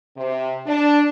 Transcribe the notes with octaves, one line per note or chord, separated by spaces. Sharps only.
C3
D4